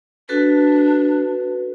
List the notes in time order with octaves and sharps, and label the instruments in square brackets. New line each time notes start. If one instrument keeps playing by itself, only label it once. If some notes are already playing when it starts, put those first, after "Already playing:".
[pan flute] D4 [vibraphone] F#4 A4 B4